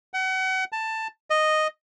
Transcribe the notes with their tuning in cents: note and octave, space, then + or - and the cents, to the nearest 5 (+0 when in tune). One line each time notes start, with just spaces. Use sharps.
F#5 +35
A5 +10
D#5 -5